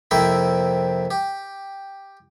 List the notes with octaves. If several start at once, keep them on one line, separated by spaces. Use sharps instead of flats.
F2 C3 A#3 E4 E5 G5
G4